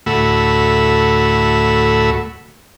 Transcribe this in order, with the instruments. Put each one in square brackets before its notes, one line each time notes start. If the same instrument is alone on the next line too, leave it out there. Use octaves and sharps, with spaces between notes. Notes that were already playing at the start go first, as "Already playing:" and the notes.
[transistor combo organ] D2 A2 A3 F#4 B5 E6